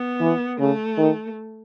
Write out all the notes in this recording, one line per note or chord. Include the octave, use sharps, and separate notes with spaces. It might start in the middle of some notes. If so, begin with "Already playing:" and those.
Already playing: B3
E3
C#3 A3
D#3